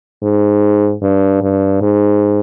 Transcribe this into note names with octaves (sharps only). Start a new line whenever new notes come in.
G#2
G2
G2
G#2